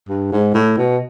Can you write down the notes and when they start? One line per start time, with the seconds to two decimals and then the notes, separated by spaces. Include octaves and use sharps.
0.09 G2
0.32 G#2
0.54 A2
0.77 B2